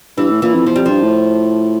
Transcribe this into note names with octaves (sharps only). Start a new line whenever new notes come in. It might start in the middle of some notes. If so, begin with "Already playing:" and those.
G2 E3
A2
A#2 E3
F2
E2 F3
F2 G3
G2 F3
A2